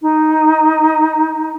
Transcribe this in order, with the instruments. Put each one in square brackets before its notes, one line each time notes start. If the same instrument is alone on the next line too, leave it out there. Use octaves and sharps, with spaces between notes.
[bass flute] D#4